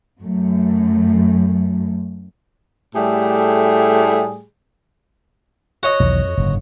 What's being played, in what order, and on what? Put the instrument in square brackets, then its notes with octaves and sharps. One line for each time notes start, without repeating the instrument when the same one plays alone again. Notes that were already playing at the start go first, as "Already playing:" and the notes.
[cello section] F#2 A3
[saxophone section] A2 G3 A3 G4 G#4
[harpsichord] F#4 C#5 D#5
[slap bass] B1 E2 D#3
F2
F#1 G#2 D3